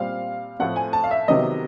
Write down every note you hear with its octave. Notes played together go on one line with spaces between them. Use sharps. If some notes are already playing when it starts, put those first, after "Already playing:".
Already playing: A#2 G3 C4 F5
A2 F3 A3 C4 F#5
G#5
A5
F5
E5
C3 D#3 F#3 B3 D#5